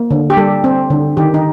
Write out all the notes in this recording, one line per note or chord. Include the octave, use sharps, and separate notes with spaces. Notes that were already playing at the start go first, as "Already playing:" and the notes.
Already playing: A#3
D3
G4
G3 A4
C4
D3
D#3 G4
D#4